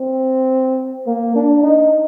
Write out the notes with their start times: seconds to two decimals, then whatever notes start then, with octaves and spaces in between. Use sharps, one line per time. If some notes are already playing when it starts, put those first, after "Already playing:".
Already playing: C4
1.07 A#3
1.35 D4
1.63 D#4